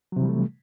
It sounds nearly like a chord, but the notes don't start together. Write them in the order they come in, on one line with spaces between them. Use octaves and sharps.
F#3 C3 E3 G3 A3